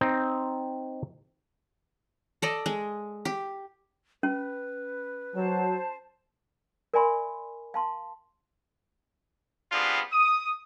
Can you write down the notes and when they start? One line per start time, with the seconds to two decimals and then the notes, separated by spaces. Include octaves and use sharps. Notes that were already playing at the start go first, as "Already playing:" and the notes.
0.01 C4 D#4
2.42 A4 D5 D#5
2.66 G#3
3.25 G4
4.23 C#4 B4
5.35 F#3 C5 A5
6.94 A#4 D5 E5 G#5 B5 C6
7.74 F5 A5 C6
9.72 G3 B3 C4 D4 F4 G#4
10.12 D#6